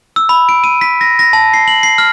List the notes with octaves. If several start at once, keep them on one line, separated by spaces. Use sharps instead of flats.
E6
B5
D7
D#7
B6
A#6
A#6
A5
C7
F#7
C7
F6